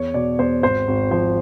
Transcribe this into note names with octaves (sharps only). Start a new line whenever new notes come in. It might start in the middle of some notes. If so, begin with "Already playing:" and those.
Already playing: E2 C#5
B2 D5
E2 C5
G#1 C5
G#1
F3 C5